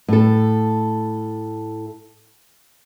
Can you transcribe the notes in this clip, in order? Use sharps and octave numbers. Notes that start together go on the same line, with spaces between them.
A2 A4